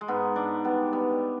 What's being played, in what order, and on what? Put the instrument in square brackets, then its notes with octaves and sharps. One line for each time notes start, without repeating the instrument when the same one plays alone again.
[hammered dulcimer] G#3
G#2 B3
G#2 D4
G3 B3
G3 B3